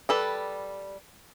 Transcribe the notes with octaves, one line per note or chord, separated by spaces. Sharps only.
G3 A4 B4